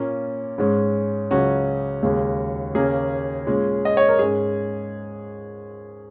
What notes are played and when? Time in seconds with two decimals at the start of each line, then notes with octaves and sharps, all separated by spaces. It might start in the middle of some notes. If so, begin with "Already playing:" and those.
Already playing: A#2 A#3 C#4
0.58 G#2 G#3 C#4
1.31 C#2 C#3 F#3 C#4 F#4
2.03 D#2 C#3 G#3 C#4
2.74 D#2 C#3 A#3 C#4 G#4
3.47 A#2 G#3 C#4
3.85 D#5
3.97 C#5
4.09 A#4
4.19 G#2 G#3 C#4 G#4